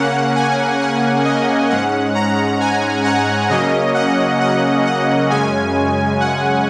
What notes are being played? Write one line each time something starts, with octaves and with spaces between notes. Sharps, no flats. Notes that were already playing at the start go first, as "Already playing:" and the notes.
Already playing: C#3 A#3 C#4 F#5
G#5
F#5
D#5
G#2 G#3 C#4 F#5
A#5
G#5
F#5
C#3 F#3 A#3 C#4 D#5
F#5
F#5
F#5
F#2 C#3 G#3 C#4 G#5
F#5